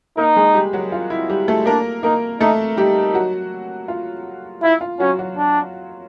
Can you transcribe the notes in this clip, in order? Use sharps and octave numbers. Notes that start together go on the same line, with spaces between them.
A#3 D#4 A#4
G#3 G#4
G3 G4
F#3 F#4
F4
E4
G3 G4
A3 A4
A#3 D4 A#4
A#3 D#4 A#4
A3 D#4 A4
G3 D#4 G4
F#3 F#4
F4
E4 F4
F4
F#3 C#4 F#4
F#3 F#4
D4